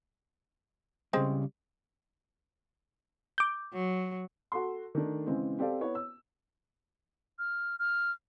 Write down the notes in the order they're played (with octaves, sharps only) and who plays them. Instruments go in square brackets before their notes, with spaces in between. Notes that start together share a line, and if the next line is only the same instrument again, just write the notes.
[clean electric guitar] C#3 G3 [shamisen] G#3 C4 C5
[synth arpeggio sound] D6 G6
[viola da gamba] F#3
[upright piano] F#4 A4 C6
D#3 A3 D4
C#3 E3 G#3 C4
C4 G4 A4 D5 F5
B3 E4 C#5
E6
[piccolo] F6
F6